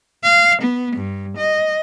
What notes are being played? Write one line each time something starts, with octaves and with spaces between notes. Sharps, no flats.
F5
B3
G2
D#5